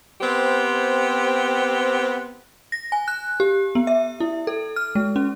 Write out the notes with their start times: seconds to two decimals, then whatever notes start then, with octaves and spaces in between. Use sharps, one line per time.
0.21 B3 C4 G4 C5
2.72 A#6
2.92 G#5
3.08 F#6
3.40 G4
3.75 B3
3.87 E5
4.20 E4
4.47 A4
4.76 F6
4.95 G#3
5.16 C#4